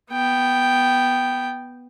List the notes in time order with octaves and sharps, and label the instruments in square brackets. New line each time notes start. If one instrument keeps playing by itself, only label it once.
[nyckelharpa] B3 G5